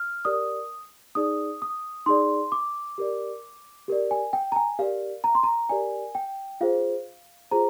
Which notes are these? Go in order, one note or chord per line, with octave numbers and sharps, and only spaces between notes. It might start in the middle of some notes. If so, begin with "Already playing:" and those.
Already playing: F6
G4 A#4 D5 D#6
D#4 G#4 D5 D#6
D#6
D#4 G#4 D5 C6
D6
G4 A#4 D5
G4 A#4 D5
G#5
G5
A#5
G#5
G4 A#4 D5 F5
A#5
C6
A#5
G4 A#4 D5 G#5
G5
F4 G#4 C5 F5
F4 G#4 C5 A#5